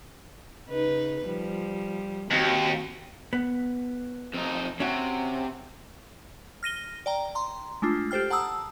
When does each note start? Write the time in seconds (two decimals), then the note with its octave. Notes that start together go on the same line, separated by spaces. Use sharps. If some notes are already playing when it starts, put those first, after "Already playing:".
0.69 C#3 D#4 B4
1.25 F3 G3
2.31 D#2 C4 F#4
3.33 B3
4.34 F2 D#4
4.80 C3 C#4 F#4
6.63 F6 A#6 D#7 G7
7.06 D5 G5 A#5
7.35 A#5 C6
7.82 G#3 A3 D4 F4
8.11 G4 A4 C5 G5 F6
8.30 F#5 A5 A#5 D#6 E6